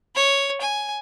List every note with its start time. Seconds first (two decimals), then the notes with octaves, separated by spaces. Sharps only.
0.15 C#5
0.61 G#5